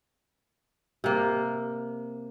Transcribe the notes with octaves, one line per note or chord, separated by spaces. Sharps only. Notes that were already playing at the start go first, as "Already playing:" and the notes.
C3 A#3